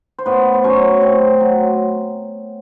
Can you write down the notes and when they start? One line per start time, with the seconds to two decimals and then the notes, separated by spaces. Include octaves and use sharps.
0.18 C5
0.26 A2 B3 B4
0.54 C5
0.64 F#3 C#4 C#5
1.01 A2 C4 C5
1.40 F#3